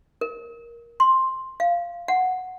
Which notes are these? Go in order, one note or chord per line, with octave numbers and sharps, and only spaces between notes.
A#4
C6
F5
F#5